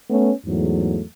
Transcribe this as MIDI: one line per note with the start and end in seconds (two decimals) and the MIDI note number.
0.10 0.33 57
0.10 0.33 59
0.10 0.33 61
0.46 1.03 40
0.46 1.03 44
0.46 1.03 54
0.46 1.03 57